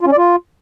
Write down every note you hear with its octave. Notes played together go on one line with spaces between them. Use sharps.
F4
C#4
D5
F4